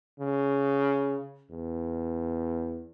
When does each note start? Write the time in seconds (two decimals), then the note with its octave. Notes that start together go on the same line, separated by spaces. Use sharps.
0.19 C#3
1.50 E2